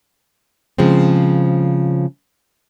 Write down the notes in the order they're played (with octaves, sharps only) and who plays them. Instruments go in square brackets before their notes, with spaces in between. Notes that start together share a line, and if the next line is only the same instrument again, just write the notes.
[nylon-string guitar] C#3 F3 G#3 C4